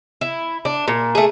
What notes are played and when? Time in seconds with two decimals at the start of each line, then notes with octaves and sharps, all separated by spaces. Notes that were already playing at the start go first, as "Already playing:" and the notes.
0.21 E4
0.65 D4
0.88 A#2
1.15 A3 G#4